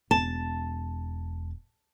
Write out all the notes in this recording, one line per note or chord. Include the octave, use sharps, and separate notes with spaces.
E1 A5